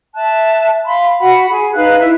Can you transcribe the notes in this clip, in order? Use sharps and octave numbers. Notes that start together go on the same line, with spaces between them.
E5 A5 F#6
F5 B5 C6
F#4 F#5 B5
G#4
D#4 B4 F5 F#6
E4 E5